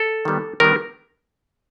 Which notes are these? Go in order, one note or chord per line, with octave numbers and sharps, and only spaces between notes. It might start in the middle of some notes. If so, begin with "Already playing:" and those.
Already playing: A4
D#3 G3 B3
D#3 G3 B3 A#4